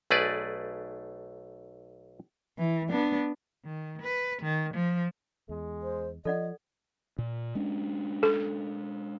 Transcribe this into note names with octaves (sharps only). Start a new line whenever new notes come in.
B1 A3 G#4 B4 D5
E3
B3 D4
D#3
B4
D#3
F3
E2 G#3
C5
F3 A4 D5 D#5 F#5
A#2
G#3 C#4 D4
A4